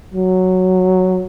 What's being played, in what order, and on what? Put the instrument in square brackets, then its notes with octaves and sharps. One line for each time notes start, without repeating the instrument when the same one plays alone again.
[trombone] F#3